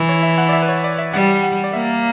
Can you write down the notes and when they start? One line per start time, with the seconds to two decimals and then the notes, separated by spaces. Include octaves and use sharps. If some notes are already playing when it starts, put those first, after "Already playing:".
Already playing: E3
0.09 C#5
0.23 E5
0.38 F#5
0.49 D5
0.53 E5
0.62 B4
0.69 C#5
0.84 D5
0.98 E5
1.13 G3 F#5
1.43 F#5
1.64 D5
1.73 A#3 E5